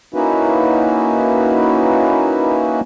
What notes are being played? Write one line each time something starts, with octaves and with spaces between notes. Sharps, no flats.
A#3 C#4 D#4 E4 F#4 B4